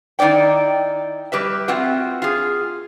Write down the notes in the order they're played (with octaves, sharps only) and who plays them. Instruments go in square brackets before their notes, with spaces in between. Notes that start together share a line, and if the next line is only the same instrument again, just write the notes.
[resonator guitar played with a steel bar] D#3 D#4 E4 D5 G5
G3 G4 B4 E5
C4 F4 F#4
F4 G#4